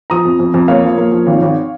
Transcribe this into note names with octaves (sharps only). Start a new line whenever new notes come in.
F3 A#5 D#6
F2
F2
F2
A#3 C#5 F5
F3
A#3
F3
G#1
G#1